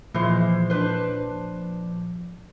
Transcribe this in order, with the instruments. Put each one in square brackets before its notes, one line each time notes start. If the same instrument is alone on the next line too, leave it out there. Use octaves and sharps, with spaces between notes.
[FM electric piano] A#2 F3 [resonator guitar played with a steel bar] E3 G#3 C5
[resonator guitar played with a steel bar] D4 B4 C5